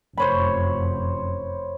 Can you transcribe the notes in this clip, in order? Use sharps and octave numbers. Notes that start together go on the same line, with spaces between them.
F1 F#2 C5 C#5 B5